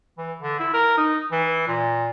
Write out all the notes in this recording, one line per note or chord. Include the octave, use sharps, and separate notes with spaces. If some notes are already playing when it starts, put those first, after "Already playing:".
E3
D3
E4
A#4
D#4
E3
A#2